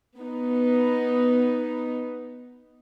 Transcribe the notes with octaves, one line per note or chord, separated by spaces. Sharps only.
B3 D#4